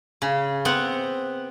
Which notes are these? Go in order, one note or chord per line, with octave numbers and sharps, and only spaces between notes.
C#3
B3 C4 F#5